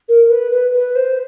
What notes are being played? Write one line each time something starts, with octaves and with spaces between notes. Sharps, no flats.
A#4
B4
B4
B4
C5